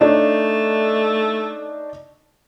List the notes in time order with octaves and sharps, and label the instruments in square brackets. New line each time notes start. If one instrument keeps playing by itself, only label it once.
[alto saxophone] A3 [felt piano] D4 D#4 C#5